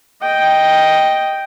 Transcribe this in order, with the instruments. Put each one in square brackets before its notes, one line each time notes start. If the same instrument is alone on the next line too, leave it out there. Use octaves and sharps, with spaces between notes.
[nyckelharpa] D#5 G5